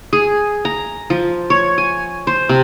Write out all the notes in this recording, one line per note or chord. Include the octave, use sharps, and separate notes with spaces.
G#4
A#5
F3
C#5
G#5
C5
C3